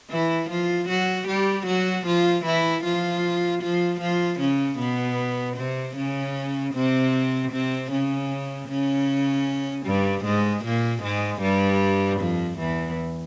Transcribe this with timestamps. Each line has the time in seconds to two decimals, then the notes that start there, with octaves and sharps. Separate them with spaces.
0.10 E3 E4
0.50 F3 F4
0.88 F#3 F#4
1.28 G3 G4
1.66 F#3 F#4
2.06 F3 F4
2.45 E3 E4
2.84 F3 F4
3.62 F3 F4
4.00 F3 F4
4.40 C#3 C#4
4.78 B2 B3
5.56 C3 C4
5.96 C#3 C#4
6.74 C3 C4
7.52 C3 C4
7.92 C#3 C#4
8.69 C#3 C#4
9.86 G2 G3
10.25 G#2 G#3
10.65 A#2 A#3
11.03 G#2 G#3
11.42 G2 G3
12.20 F2 F3
12.59 E2 E3